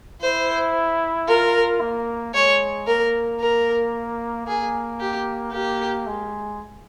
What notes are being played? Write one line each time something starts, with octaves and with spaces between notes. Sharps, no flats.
E4 C5
F4 A#4
A#3
G#3 C#5
A#3 A#4
A#4
A#3 G#4
G4
A#3 G4
G#3